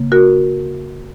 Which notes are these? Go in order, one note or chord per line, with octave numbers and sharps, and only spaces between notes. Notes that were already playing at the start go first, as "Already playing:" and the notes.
Already playing: C#3 A#3
F#4 A#4